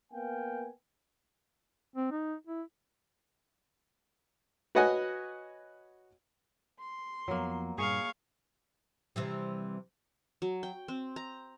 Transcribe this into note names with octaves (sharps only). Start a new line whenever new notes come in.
A#3 B3 F5 G5 G#5
C4
D#4
E4
F#4 B4 C#5 D#5 F#5 G#5
C6
F2 F3 F#3 A#3 B3
G2 A#2 G#4 F5 C#6
C3 E3 G3
F#3
G5
C4
A#5